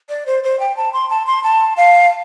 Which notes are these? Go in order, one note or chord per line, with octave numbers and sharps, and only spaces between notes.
D5
C5
C5
G5
A5
C6
A5
C6
A5
F5